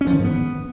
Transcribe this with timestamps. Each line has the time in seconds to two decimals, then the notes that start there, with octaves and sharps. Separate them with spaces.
0.01 C#4
0.07 F3
0.13 D#3
0.18 G#2
0.24 B3